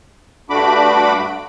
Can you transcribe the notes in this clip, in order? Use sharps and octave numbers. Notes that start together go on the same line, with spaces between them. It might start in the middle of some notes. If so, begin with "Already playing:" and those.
G2 A3 D4 F#4 B5 D6